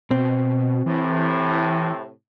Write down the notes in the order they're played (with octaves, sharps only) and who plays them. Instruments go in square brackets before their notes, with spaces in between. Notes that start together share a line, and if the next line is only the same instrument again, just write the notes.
[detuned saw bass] B2 [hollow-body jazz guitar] C4
[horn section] A2 C3 [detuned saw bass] E3